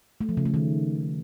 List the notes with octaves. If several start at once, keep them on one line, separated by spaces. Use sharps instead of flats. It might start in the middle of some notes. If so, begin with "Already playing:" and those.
A3
F3
C#3
A3
D#3